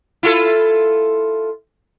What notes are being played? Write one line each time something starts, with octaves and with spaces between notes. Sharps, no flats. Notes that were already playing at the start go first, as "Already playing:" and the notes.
E4 F4 A4